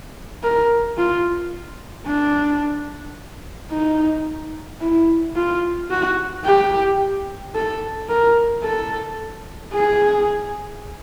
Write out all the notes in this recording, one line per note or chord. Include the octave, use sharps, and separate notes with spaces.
A#4
F4
D4
D#4
E4
F4
F#4
G4
A4
A#4
A4
G#4